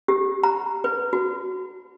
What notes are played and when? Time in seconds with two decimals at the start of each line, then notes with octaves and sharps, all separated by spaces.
0.08 G4
0.43 A#5
0.84 B4
1.13 F#4